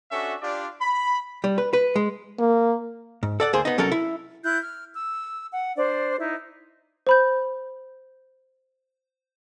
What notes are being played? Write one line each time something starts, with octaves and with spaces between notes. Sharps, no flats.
C#4 D4 F#4 A4 E5
D4 F4 G4 D5
B5
G3
B4
B4
G#3
A#3
G#2
A4 D5 F#5
D2 A#3 G#4 C5
B3 D#4
C2 F#3 C#4 A4 A#4
E4
E4 F#6 G6
F6
E6
F#5
D4 C5 D5
D#4 E4
C5 B5 G6